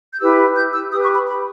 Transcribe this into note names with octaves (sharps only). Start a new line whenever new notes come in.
G6
E4 G4 B4 E6
G6
E6
G4 B4 D#6
C#6
B5
B5